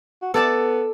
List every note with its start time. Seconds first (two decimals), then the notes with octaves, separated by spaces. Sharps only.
0.22 F#4
0.34 B3 A4 D5 A5